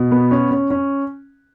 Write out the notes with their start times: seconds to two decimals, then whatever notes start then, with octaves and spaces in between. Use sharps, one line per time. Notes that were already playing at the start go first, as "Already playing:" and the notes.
Already playing: B2
0.11 B3
0.31 C#4
0.51 C#4
0.71 C#4